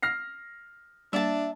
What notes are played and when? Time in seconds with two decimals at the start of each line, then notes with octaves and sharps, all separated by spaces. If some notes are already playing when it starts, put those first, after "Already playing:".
0.02 F6 A#6 C7
1.13 G3 A#3 D4 E5 A5